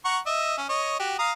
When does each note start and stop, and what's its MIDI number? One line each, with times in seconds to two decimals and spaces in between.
0.05 0.18 78
0.05 0.18 82
0.05 0.18 85
0.26 0.56 75
0.26 0.56 76
0.58 0.67 61
0.69 0.95 73
0.69 0.95 75
0.99 1.16 66
0.99 1.16 67
1.19 1.32 77
1.19 1.32 82
1.19 1.32 87